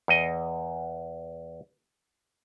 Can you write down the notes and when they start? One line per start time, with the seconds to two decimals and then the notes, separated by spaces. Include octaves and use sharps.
0.08 E2 D#5